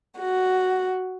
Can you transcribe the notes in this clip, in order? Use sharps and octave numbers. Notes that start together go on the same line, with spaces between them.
F#4